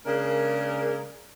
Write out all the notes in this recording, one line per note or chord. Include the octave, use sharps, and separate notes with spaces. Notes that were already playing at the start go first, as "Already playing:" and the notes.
C#3 G#3 A#3 D4 A#4